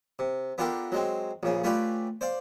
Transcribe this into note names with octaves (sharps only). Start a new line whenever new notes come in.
C3
B3 D4 F4 G4 A4 A#4
F#3 G#3 C4
A#1 C#3 C#4
A3 C#4 F4 G4 B4 D5
C5 D5 F5